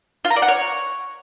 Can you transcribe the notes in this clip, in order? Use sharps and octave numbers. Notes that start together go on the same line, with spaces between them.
F4
A#5
D5
F#5
C#5